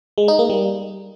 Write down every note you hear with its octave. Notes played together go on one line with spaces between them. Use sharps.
G#3
D#4
A#3
G3